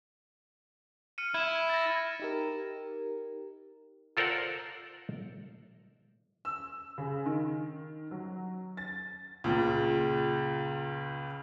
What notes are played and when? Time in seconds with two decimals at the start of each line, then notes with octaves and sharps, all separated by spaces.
1.18 F6 C#7 D#7
1.34 E4 G#6 E7
1.70 A6 A#6
2.20 D#4 G4 A#4
4.17 F4 A4 A#4 C5 D5 F#5
6.45 E6
6.98 C#3
7.26 D#3
8.11 F#3
8.77 A6
9.44 C#2 A#2 C#3